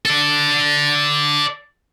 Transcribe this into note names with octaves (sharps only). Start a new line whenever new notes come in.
A4 D5